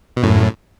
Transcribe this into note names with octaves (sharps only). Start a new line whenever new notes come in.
B2
F#2 A2